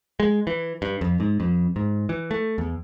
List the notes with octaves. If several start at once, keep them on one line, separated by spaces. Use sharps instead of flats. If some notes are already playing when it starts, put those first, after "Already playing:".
G#3
E3
G2
F2
G#2
F2
G#2
E3
A3
E2